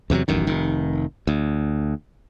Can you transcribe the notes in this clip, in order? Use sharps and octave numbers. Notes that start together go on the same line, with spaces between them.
E2 C3 F3 F#3
E1 A1 F#2 D#3
F1 D#3
D2